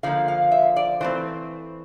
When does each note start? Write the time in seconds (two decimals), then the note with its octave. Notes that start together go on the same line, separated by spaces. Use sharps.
0.03 D3 F3 A#3 F5
0.28 F5
0.51 E5
0.76 D5
1.01 E3 A3 C4 C5